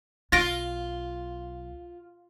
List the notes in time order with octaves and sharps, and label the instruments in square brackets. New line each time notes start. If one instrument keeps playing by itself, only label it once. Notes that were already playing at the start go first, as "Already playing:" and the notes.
[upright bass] B1 [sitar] F4 [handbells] A6 A#6 D7